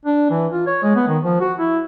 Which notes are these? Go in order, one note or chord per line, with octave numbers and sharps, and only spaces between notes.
D4
E3
F4
C#5
G#3
B3
D#3
F3
F#4
E4